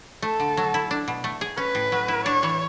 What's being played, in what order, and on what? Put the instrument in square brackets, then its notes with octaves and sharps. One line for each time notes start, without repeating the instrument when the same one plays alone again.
[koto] A3 [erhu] A4
[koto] D3
F#3
E4
D4
B2
A3
G#4
[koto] C#4 [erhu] B4
[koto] A2
F#3
E4
[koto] D4 [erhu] C#5
[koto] E3